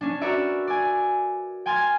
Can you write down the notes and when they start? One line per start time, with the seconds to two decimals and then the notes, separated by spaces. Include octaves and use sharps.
0.01 C#4 D4
0.21 F#4 A#4 B4 C#5 D5 E5
0.67 D5 G#5
1.66 G5 G#5 C6 F6 G#6 A6